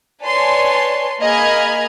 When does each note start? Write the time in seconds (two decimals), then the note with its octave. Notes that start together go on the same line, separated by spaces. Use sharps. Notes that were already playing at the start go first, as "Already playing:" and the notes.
0.24 B4 C#5 D5 G#5 A5 C6
1.22 A#3 G#4 D#5 B5 F6 G#6